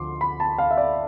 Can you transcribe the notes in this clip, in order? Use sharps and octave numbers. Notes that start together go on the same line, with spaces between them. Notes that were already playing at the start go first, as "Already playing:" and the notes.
Already playing: D2 F3 C6 D6
B5
A5
F5
E5
D5